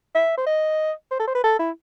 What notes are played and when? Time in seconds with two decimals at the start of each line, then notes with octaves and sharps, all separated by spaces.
0.15 E5
0.37 C5
0.46 D#5
1.11 C5
1.20 A4
1.27 C5
1.35 B4
1.44 A4
1.59 E4